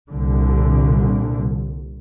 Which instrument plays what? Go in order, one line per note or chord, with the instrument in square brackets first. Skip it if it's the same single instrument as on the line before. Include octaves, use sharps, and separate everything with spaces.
[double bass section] C2 A#2 D3